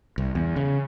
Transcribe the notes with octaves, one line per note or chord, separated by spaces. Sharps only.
C2
E2
C#3